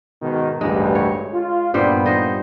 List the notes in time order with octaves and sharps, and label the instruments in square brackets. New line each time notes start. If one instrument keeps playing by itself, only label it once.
[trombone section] G#2 B2 D#3
[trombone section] A1 D2 G2 [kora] G#3
[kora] C#5
[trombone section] F4
[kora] G2 G3 C5 [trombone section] A#2 B3
[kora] D#4 C5 D#5